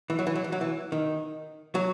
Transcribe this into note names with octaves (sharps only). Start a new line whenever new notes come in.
E3
F#3
E3
F#3
E3
F#3
E3
D#3
F#3